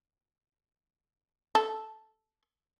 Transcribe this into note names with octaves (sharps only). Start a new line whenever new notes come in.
A4